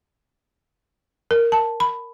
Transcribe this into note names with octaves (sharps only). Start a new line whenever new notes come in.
A#4
A5
B5